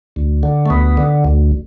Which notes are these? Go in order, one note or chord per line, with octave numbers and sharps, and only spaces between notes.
D2
D3
A3
D2 B3
D3
D2